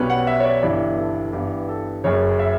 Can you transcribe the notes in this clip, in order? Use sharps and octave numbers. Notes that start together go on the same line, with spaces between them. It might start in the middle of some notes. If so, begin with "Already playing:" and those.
Already playing: B1 B2 G3 C#4 B4
F#5
E5
C#5
D5
G1 G2 E3 B3 E4 D5
A4
G2 E3 B3 G4
A4
F#1 F#2 C#3 C#5
E5